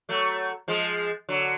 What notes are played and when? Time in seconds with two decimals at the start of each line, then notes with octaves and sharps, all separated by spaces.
0.09 F#3 A3
0.68 F3 G#3
1.29 D3 F#3